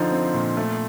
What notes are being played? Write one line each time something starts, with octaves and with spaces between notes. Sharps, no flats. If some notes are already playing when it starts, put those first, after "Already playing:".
Already playing: D3 F3 D#4
C4
A#2
A3